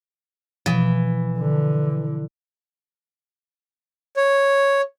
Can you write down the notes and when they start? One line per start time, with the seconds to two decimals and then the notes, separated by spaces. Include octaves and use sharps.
0.66 B2 E3 F3
1.39 D3
4.17 C#5